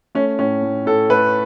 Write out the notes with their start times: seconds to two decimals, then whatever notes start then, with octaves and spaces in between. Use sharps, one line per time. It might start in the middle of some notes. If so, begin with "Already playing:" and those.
0.15 A3 C#4
0.39 A2 C#4
0.63 A2
0.86 A2 A4
1.10 A3 B4